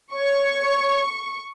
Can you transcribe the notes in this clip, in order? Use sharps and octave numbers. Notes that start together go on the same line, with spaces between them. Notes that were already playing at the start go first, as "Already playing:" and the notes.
C#5 C#6